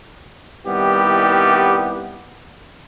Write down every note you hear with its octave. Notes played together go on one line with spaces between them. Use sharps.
C2 D#3 G3 B3 E4 G4